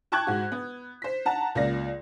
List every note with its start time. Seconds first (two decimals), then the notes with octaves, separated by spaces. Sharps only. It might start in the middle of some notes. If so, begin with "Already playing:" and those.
0.12 G5 A5 C#6 D6 F#6 G#6
0.27 G#2 F#4
0.52 B3
1.02 C5 B6
1.26 F#5 A5 A#5
1.55 C#2 A#3 F4 D5 A#6